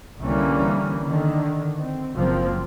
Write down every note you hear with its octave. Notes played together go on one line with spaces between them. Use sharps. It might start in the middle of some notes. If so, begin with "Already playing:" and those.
C2 D3 E3 G3 A#3 C#4
D3 D#3
C4
F#1 F3 A#3 C4